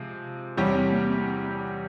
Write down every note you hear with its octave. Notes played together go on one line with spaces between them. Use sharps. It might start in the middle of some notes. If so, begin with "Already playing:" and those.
Already playing: C3 F3 G#3 C4
E2 C3 E3 G3 C#4 E4 G4
C4
A#3
C4
C4